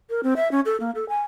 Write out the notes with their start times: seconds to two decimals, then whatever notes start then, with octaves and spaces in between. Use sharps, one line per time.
0.10 A#4
0.23 C4
0.36 E5
0.52 C#4
0.66 A4
0.80 A#3
0.95 A4
1.09 G#5